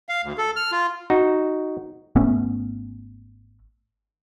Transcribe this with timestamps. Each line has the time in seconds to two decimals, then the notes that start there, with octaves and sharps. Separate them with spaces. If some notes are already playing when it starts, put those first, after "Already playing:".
0.09 F5
0.24 D2
0.38 A4
0.56 F6
0.72 F4
1.10 D#4 F#4
2.16 G#1 A3 B3 C#4